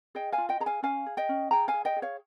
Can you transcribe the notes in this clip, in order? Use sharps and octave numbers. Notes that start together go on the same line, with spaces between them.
G#4 D#5 G5
F5 G#5
F4
D#5 G5
G#4 A#5
F5 G#5
C#4 F5 G#5
G#4
D#5 G5
C#4
G#4 G5 A#5
F5 G#5
G#4
D#5 G5
G#4
C#5 F5